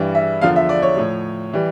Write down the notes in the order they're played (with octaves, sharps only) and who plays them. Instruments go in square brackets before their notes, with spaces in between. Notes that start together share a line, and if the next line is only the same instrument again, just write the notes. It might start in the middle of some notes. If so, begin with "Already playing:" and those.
Already playing: [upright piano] G2 E3 G3
E5
E2 D3 F3 F5
E5
D5
C#5
A2 F3
E3 G3